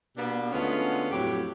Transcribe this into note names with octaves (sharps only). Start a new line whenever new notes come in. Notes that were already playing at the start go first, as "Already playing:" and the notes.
B2 A#3 B3 D4 G4 D5
D2 D3 G#3 B3 C#4 F4
F2 A2 F#3 G4